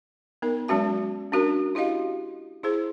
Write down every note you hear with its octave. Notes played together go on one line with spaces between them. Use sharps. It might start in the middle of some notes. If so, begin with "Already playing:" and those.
B3 D#4 A#4
F#3 G#3 C#4 F#4 A5
C#4 D4 F#4 A#4
E4 F#4 G4 D#5 F5
E4 G#4 C5